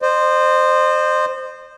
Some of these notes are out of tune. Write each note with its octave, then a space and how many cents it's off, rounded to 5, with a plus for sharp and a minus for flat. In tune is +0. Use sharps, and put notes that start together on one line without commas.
C5 +0 D#5 -40